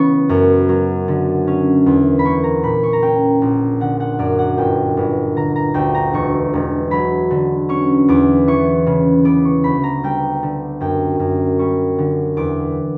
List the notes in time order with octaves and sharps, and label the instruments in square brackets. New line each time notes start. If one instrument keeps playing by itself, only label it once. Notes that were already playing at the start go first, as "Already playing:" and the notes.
Already playing: [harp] C#3 E3 B3 C#6
F#2
F#3
D3
C#4
E2
B5
A#3 C#6
A#5
A#2 B5
C#6
A#5
C#4 G5
A#1
D3 F#5
F#5
F#2 D5
F#5
G1 G5
G1
D3 A#5
A#5
D2 G5
A#5
E1 C#6
E1
F#3 B5
D3
C#4 C#6
E2 D6
E3 C#6
C#3
B3 D6
C#6
D2 B5
A#5
G3 G5
D3
F#2 G5
F#2
G3 C#6
D3
E2 D6